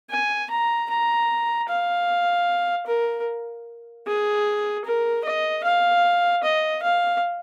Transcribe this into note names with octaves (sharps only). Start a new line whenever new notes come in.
G#5
A#5
A#5
F5
A#4
G#4
A#4
D#5
F5
D#5
F5